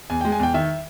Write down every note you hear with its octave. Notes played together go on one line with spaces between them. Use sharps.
E2 G#5
G#3 G5
G#5
E2 G5
D#3 E5